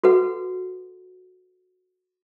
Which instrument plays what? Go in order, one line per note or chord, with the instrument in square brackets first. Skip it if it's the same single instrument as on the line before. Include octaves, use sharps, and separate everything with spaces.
[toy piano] F#4 A4 B4 F#5